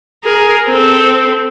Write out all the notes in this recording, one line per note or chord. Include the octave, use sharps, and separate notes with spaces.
G#4 A#4
C4 A4